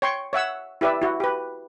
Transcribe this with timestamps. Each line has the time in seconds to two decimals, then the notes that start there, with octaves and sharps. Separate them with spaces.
0.02 C#5 G5 C6 C#6
0.33 C#5 E5 F#5 E6
0.81 E4 G4 B4 D5 E5
1.02 E4 F#4
1.20 G4 B4